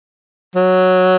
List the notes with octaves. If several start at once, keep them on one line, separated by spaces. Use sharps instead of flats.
F#3